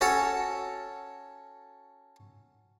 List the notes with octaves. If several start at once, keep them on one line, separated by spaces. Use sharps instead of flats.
C#4 F#4 A4 C#5 A5